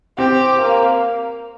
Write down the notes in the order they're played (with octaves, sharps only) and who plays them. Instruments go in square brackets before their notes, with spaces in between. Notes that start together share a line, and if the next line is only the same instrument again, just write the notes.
[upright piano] C4 [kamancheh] G4
[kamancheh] A#3